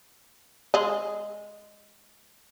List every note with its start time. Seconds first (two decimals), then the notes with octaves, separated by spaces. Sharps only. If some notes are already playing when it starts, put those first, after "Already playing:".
0.74 G#3 D#5